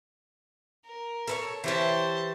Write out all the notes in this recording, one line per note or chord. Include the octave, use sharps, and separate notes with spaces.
A#4
A4 B4 C#5
E3 G4 C5 C#5 A5